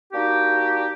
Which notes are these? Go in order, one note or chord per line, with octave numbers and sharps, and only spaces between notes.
A#3 D4 D#4 F#4 G4